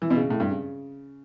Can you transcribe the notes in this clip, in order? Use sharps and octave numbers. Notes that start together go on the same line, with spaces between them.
E3
B2
C#3
A2
G2
C#3